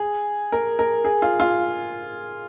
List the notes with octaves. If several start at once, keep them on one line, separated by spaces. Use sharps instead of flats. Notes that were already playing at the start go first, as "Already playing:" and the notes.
Already playing: G#4
A#4
A#4
G#4
F4
F4